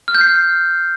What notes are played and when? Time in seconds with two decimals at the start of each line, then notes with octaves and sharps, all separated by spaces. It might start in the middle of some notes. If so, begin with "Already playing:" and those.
0.08 F6
0.15 G6
0.21 C7